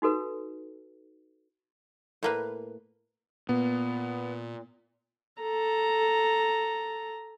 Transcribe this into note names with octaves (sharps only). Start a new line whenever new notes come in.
D#4 F#4 A4 B4
A2 A#3 B4
A#2 B3
A4 A#5